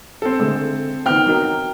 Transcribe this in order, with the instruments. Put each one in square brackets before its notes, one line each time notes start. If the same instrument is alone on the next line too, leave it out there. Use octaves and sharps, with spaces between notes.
[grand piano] C4 A4
[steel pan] D3 G#3 A3
[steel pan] D#3 B3 C4 [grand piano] G5 F6
[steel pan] F#3 D#4 A#4